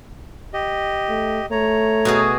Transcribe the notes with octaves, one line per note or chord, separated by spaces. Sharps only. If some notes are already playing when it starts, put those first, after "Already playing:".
G4 D#5
A3
A3 C#5 A#5
B2 F#4 G#4